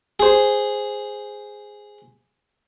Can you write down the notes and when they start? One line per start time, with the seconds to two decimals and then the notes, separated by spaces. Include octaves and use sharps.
0.20 G#4 C5